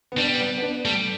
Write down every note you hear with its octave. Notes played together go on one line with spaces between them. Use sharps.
B3
G3 D4
B3
B3
D4
G3 A3